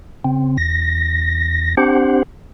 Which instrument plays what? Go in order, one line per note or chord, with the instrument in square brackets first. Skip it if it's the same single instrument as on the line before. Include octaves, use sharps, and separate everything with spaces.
[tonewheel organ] C#3 C4
E2 A#6
C4 D4 G4 C5 F#5